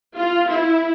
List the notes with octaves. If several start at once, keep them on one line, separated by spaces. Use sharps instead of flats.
F4
E4